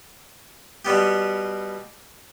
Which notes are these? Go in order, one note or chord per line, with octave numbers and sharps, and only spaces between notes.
B2 G3 B3 G4